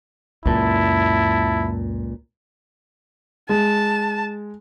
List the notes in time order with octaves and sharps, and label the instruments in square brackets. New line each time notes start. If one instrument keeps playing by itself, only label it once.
[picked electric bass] C#2 A#2 [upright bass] F#2 [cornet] E4 [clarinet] A5
[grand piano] G#3 [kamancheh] A5